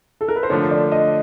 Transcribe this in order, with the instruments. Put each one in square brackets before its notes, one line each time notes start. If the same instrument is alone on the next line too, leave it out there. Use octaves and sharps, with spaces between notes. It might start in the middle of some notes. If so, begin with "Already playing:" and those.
[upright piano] A4
A#4
B4
C5
[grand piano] D3 F3 A3 [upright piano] C#5
[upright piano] D5
D#5